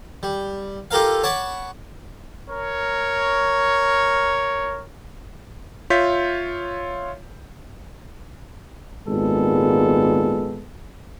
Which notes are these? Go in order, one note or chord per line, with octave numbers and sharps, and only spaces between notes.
G3
F4 G4 A4 A#4 F5
C#5 F#5 A5 B5 D6
A#4 C#5
F4 C#5 E5 G6 B6
G#1 A#2 G#3 B3 A4